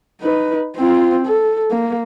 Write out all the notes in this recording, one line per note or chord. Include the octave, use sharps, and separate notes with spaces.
D#4 B4
C4 F4
A4
A#3